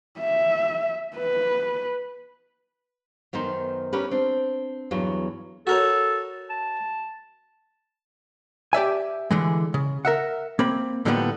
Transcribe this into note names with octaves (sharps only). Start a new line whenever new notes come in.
E5
B4
F#2 D#3 B3 D#4 C5
G3 C#4 G4 A#4 B4
C4 D4
E2 G2 F#3
F#4 A4 A#4 C#5
A5
G4 D5 E5 G#5
D3 E3 G#3
C#3
A#4 E5 F#5
A#3 C4 B5
A2 D3 F3 G3 A#3 B3